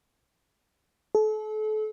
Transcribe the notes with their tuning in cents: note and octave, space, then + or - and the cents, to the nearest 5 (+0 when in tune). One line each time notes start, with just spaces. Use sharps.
A4 -35